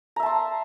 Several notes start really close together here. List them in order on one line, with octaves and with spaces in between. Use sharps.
A#5 E5 A5 C6